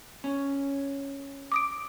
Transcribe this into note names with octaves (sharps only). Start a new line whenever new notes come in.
C#4
D6 D#6 D7